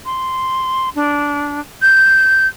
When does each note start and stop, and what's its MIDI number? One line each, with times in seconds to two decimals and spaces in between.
0.05 0.89 84
0.95 1.61 62
1.82 2.47 91